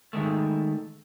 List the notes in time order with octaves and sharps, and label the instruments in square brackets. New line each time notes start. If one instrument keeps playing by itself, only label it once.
[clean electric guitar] D#3 E3 G#3 A3